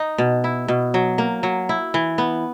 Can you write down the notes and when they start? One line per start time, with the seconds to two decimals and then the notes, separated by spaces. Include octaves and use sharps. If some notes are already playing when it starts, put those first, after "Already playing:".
Already playing: D#4
0.18 B2
0.44 E4
0.68 B2
0.94 F#3
1.18 A#3
1.43 F#3
1.69 E4
1.94 E3
2.18 B3